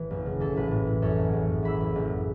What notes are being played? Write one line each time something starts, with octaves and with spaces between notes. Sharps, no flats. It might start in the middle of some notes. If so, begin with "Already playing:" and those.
Already playing: A1 A2 E3 B4
F#1
C#3
E3 A4
A1 B4
A2
A2
F#2 A4 C#5
F#1
F#1
F#2
E3 B5 E6
F#1
F#1